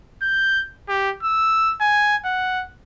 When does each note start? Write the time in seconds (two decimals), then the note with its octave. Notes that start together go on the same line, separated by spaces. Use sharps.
0.22 G6
0.89 G4
1.23 E6
1.81 G#5
2.25 F#5